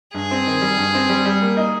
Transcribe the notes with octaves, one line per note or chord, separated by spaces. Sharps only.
G2 G#4
C4
D#3
G3
G2
C4
G3
G3
A#3
D#4